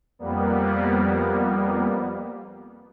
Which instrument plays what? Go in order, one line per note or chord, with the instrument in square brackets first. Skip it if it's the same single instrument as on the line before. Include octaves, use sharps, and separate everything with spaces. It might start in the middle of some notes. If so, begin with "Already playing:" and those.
[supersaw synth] F2 G3 A#3 B3